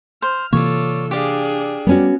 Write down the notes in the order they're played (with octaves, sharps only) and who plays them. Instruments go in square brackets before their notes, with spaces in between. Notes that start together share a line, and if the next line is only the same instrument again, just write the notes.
[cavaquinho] C5 [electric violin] F6
[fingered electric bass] C3 E3 A#3 [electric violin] F4 A4 [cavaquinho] C#5 D5
[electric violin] D4 G#4 [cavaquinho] G4 D5 F5
[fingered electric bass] G3 [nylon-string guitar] B3 C#4 F#4